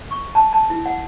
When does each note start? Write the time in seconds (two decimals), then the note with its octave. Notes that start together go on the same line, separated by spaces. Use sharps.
0.11 C#6
0.35 A5
0.53 A5
0.70 E4
0.86 F#5